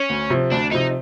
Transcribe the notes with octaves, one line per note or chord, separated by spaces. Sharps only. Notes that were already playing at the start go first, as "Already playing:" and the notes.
Already playing: C#4
D2
C3 F3
D2 D4
C3 F3 D#4